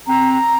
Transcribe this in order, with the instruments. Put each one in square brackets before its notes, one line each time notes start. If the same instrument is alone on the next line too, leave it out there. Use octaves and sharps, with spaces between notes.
[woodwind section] C4 A#5